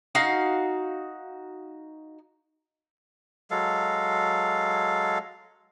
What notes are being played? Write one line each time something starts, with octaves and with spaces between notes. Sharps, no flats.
D#4 F#4 F5
F#3 G#3 A4 F5